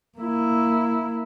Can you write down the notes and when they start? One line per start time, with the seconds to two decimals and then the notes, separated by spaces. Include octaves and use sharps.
0.18 A#3 E4